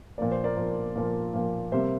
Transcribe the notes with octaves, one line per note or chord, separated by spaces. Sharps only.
A#2 F3 A#3 D5
C5
A#4 D5
A#2 F3 A#3
A#2 F3 A#3
A#2 F3 A#3
C3 G3 A#3 C5 E5